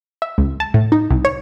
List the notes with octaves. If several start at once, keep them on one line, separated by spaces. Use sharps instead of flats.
E5
C#2
A5
A2
D#4
C2
C#5